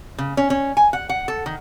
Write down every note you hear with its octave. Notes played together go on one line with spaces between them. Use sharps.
C#3
C#4
C#4
G#5
F#5
F#5
A4
D#3